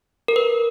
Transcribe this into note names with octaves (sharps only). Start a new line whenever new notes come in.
A#4
B4